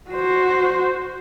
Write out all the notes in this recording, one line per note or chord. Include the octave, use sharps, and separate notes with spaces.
F#4 C5